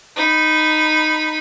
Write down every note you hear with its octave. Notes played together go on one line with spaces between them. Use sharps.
D#4 B5